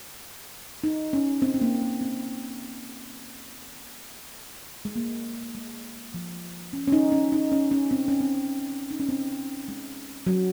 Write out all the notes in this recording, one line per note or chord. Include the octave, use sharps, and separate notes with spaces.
D#4
C#4
C4
C4
A#3
A#3
C4
G#3
A#3
G#3
F3
C#4
C#4
D#4
C#4
D#4
C#4
C#4
C4
C#4
C4
D#4
C#4
C4
G#3
F#3